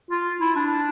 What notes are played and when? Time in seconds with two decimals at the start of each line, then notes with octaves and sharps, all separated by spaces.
0.11 F4
0.41 E4
0.56 D4